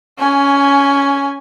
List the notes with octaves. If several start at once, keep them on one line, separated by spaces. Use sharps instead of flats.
C#4 G#5